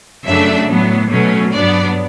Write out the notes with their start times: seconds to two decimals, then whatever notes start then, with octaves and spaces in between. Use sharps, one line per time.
0.25 F#2 C#3 F#3 A3 D4 E5
0.68 A2 F#3 B3
1.10 B2 F#3 A3 C#4
1.52 G2 F#3 B3 D4 D5